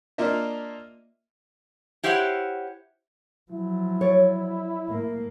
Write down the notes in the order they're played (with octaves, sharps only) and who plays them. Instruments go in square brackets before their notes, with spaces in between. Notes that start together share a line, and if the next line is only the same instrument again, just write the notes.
[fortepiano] A#3 D4 F4 A#4 D#5 E5
[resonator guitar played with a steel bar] E4 G4 C5 C#5 F5 F#5
[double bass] F3 F#3 [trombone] E4
[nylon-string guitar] C#5 D5
[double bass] A2 A#3